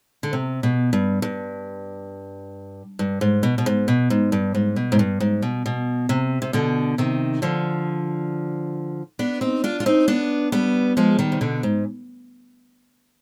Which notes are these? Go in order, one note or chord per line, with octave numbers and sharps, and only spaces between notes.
D3
C3
B2
G2
G2
G2
G#2
B2
B2
G#2
B2
G#2
G2
G#2
B2
G#2
G2
G#2
B2
B2
C3
C3
B2 D3
C3 D#3
D3 F3
B3 D4
C4 D#4
D4 F4
F4
C4 D#4
B3 D4
G3 B3
F3 G#3
D#3 G3
C3
B2 D3
G#2